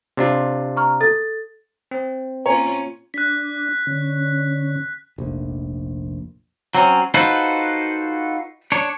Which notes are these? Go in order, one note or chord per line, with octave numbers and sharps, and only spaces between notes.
C3 D4 F4
A#5 C#6 F6
A4 A6
C4
A#2 C#4 F4 C#5 G#5 A#5
D4 F#6 B6
D3 C#4
F1 A#1
F#3 C4 C#4
D#4 F4 F#4 A4 B4 C5
D4 C#5